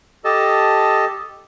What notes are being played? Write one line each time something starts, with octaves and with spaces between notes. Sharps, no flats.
G4 A4 D#5 A5